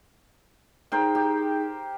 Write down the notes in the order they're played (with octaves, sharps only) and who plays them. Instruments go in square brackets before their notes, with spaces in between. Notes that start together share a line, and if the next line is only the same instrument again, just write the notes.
[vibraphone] D#4 G#4 [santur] A#4 C5 G5
[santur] G4